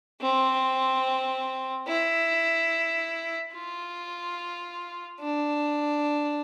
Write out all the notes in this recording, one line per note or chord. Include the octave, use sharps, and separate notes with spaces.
C4
E4
F4
D4